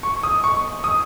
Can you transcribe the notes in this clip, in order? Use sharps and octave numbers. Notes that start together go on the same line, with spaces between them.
C#6
D#6
C#6
D#6